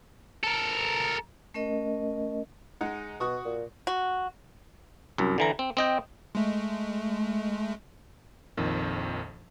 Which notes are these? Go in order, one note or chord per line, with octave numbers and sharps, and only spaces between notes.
A4 A#4
A3 C#4 A#4 D#5
G#3 D#4 F#5
B2 F#4 C#6 D#6
A#2
F#4
C2 F#2
D3 E3 A#5
C4
C4 D#5 G5
G#3 A3
A#1 F2 D#3